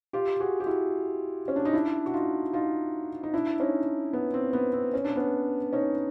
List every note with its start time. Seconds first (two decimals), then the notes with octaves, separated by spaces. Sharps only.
0.13 F4 G4
0.40 F#4 G#4
0.60 G4
0.66 E4 F#4
1.48 C#4
1.56 D4
1.65 D#4
1.73 D4 E4
2.06 F#4
2.14 D#4 F4
2.53 D#4 F4
3.23 D#4
3.33 D4 E4
3.60 C#4 D#4
4.13 B3
4.34 C4
4.53 B3
4.73 C4
4.94 C#4
5.04 D4
5.16 B3 C#4
5.73 C#4 D#4